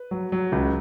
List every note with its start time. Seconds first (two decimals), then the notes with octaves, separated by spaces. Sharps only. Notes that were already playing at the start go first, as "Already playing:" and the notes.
Already playing: B4
0.11 F#3
0.32 F#3
0.52 C#2